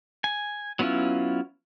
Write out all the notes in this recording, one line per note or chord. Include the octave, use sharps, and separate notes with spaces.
G#5
F#3 B3 C#4 E4 F4